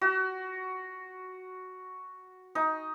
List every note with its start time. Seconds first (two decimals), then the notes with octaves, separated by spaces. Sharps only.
0.01 F#4
2.55 D#4